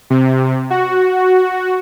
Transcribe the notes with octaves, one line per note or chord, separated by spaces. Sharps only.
C3
F#4